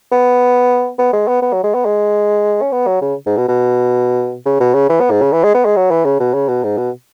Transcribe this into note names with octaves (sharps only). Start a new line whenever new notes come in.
B3
B3
G#3
B3
B3
F#3
G#3
B3
G#3
C#4
B3
F#3
C#3
G#2
B2
B2
C#3
B2
C#3
E3
B3
G#2
C#3
E3
G#3
B3
G#3
F#3
E3
C#3
B2
C#3
B2
G#2
B2